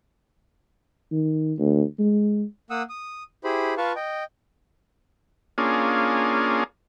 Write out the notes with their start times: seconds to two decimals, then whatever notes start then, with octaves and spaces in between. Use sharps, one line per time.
1.12 D#3
1.59 D2
1.99 G#3
2.70 A#3 F#5 D#6 E6
2.89 D#6
3.44 E4 G4 G#4 C5 B5
3.77 F4 B4 F5 A5 C#6
3.96 D#5 G5
5.58 A#3 C#4 D4 F4 G#4